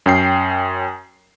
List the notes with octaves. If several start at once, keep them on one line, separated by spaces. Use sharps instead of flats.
F#2 C#4 G5 C7